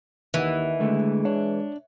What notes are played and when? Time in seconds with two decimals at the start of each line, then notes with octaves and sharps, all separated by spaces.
0.34 D#2 D#3 E3 E5 F#5
0.80 D3 G#3 A3
1.25 D4 C#5